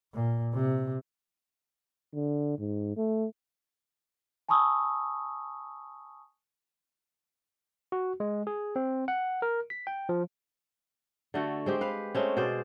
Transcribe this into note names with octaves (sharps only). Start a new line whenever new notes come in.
A#2
C3
D3
G#2
A3
G#5 A5 B5 C#6 D#6 E6
F#4
G#3
G#4
C4
F#5
A#4
B6
G5
F3
D3 A3 F#4
G#3 C4 G4
B4 F5
G#3 A3 C4 C#4
B2 G#4 C5 D5